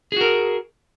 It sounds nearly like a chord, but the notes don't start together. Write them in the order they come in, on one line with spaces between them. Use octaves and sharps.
G#4 F#4 A#4